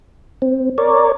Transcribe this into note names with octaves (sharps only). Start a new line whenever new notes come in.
C4
A#4 C#5 D5